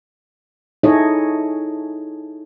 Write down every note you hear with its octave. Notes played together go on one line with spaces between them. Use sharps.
D#4 E4 G#4 A4 C#5 D#5